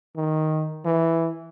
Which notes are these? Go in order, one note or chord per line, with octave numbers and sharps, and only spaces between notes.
D#3
E3